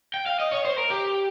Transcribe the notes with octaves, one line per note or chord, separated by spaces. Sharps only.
G5
F5
D#5
C#5
C5
A#4
G4